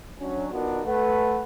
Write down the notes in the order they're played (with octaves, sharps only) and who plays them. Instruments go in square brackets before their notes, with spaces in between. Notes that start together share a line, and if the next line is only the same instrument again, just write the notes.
[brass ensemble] F#3 C#4 D4
B3 D4 D#4 F4 F#4 A#4
A3 B4 F#5